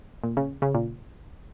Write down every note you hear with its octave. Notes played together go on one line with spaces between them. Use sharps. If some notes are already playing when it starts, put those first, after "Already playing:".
A#2
C#3
C#3
A#2